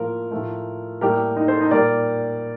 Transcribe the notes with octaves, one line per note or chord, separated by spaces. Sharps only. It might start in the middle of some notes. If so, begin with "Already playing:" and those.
Already playing: A2 F3 A#3 A#4
A2 F3 A3
A2 G3 A#3 G4 A#4
D#4
A4 C5
D#4
A#2 G3 A#3 A#4 D5